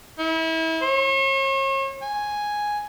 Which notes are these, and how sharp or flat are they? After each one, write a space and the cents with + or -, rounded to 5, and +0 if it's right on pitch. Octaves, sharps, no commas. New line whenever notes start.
E4 -30
C#5 -40
G#5 +0